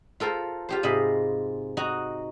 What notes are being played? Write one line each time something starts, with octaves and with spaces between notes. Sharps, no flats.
F4 A4 A#4 C5
F4 G4 C5
G#2 C3 D#5 B5
D#4 F#4 A#5